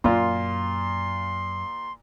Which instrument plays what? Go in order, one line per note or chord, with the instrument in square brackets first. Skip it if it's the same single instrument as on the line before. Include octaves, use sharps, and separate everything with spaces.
[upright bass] F#2 [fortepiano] A#2 F4 [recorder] C6